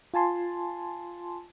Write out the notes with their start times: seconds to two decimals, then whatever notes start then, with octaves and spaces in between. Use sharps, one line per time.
0.14 F4 G#5 A5 C6